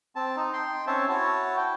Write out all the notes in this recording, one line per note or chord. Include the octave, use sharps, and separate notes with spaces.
C4 A5
D#4
G5 C6
C4 C#4 C#5 E5 A5
E4 F#4 C#5 A5
G5